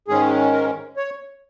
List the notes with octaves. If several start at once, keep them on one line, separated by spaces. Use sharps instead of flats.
G#2 D#3 G#3 C#4 G#4
A#4
C#5